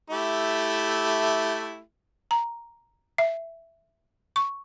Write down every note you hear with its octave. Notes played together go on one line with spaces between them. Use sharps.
A3 E4 G4
A#5
E5
C#6